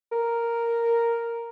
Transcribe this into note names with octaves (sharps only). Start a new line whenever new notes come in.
A#4